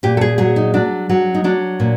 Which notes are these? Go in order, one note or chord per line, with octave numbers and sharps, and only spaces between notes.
A#2 G4
A4
G#4
F#3 G#4
D#4
F#3 D4
F#3
D#4
F#3 D4
A#2